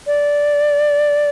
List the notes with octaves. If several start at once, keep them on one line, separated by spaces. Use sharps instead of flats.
D5